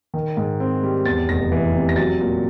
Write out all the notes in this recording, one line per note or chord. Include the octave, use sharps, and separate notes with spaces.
D#3
G#2
C4
G3
E2 A6
F1 A#6
E3
C3
A#6
F#3 A6
A#2